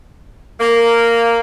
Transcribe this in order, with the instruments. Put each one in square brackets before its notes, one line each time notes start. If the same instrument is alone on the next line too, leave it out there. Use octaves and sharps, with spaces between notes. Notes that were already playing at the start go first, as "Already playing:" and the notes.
[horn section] A#3